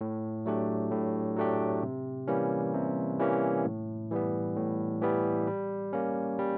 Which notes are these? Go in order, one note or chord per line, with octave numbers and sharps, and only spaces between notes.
A2
F#3 A3 D4 G4
A2
F#3 A3 D4 G4
C3
E3 G3 A#3 C#4
C3
E3 G3 A#3 C#4
A2
E3 G3 B3
A2
E3 G3 B3
G3
A#3 C#4
G3